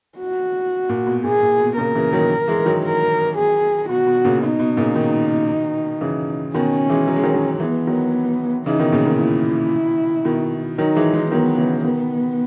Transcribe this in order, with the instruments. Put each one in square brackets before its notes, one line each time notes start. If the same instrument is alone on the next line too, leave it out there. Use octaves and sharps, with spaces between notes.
[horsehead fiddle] F#4
[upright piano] A#2
B2
[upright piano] A#2 [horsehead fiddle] G#4
[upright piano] A#2
B2
[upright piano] A#2 C#3 [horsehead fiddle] A#4
[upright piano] C#3 E3
D#3 F#3
E3 G#3
D#3 F#3
[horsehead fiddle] A#4
G#4
[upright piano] B2 [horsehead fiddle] F#4
[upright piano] B2
A#2 C#3
[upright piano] B2 [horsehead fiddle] D#4
[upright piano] B2
A#2 C#3
B2 D#3
C#3 E3
[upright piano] B2 D#3 [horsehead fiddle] C#4
[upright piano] E3 G#3
F#3
G#3
D#3 F#3
D#3 F#3
[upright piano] E3 G#3 [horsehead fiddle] B3
[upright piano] D#3 F#3
[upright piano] C#3 E3 [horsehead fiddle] D#4
[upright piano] B2 D#3
A#2 C#3
B2 D#3
[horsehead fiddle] E4
[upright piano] B2 D#3
[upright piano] D#3 F#3 [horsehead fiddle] D#4
[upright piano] E3 G#3
E3 G#3
[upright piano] D#3 F#3 [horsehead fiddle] B3
[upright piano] C#3 E3
[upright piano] B2 D#3 [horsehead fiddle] B3